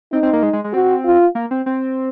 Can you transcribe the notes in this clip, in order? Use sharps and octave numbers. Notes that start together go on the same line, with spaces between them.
C4 D#4
C4
A#3
G#3
G#3
G#3
C4 F#4
F4
A#3
C4
C4